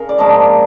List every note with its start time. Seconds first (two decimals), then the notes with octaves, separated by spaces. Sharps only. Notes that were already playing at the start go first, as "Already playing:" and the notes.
Already playing: C#3 A#4
0.09 D5
0.18 G#2 F3 A#3 D4 D#5